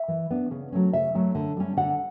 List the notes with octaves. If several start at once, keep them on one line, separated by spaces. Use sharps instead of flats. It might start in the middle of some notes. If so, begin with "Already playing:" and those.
Already playing: E5
E3
B3 D4
C#3
F#3 A3 C#4
C#3 E5
F#3 A3 C#4
D3
G3 C#4
D3 F#5